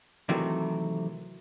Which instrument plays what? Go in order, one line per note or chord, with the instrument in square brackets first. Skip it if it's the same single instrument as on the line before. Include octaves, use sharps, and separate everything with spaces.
[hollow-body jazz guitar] C3 D#3 E3 F#3 A3